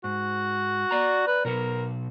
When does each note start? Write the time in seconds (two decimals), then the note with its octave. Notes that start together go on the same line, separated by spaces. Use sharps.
0.04 G#2 F#4
0.91 D5 A#5
1.27 B4
1.45 B2 F#3 A#4 F#5